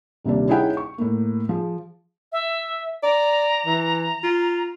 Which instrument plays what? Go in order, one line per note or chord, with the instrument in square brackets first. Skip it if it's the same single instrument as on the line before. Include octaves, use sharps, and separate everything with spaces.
[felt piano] D#1 D#2 C3 D4
C#4 D#4 E4 G#4 F#5 G5
C#6
A2 A3 A#3
F3 G#4
[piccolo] E5
[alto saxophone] D5 [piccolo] A#5
[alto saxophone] E3
F4